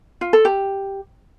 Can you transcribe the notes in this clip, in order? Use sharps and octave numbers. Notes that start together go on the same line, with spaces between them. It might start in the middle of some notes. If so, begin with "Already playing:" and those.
F4
A4
G4